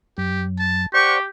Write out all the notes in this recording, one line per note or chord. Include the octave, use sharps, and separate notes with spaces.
F#2 G4
A5
G4 C5 D5 F#5 C#6